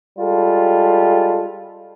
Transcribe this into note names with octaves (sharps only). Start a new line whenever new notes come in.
G3 G#3 F4 A4